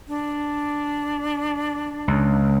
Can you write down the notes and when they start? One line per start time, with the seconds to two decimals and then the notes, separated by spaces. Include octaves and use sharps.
0.08 D4
2.08 C#2